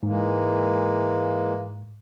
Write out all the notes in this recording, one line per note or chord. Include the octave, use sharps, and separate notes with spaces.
G#2 E3 G#3 A#3